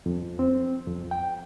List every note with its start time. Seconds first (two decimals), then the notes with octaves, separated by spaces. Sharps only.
0.06 F2
0.39 C4
0.88 F2
1.11 G5